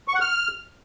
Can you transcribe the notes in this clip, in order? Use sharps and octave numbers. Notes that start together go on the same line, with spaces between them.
C#6
F#5
F6